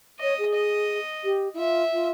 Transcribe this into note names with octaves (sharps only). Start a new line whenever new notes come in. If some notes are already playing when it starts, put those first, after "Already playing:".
C#5 D#5
G#4
D#5
G4
E4
F4 E5
F4